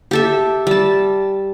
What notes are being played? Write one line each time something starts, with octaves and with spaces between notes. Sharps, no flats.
G4 A4 E5
G3 A5